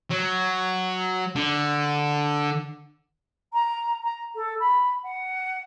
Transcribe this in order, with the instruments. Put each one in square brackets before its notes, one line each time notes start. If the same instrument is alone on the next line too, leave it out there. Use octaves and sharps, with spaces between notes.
[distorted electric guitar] F#3
D3
[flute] A#5
A#5
A4
B5
F#5